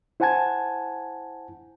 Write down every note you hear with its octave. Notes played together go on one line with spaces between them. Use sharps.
E4 C5 F#5 G#5 A5 G#6